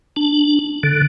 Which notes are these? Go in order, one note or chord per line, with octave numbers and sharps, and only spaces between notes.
D4
D3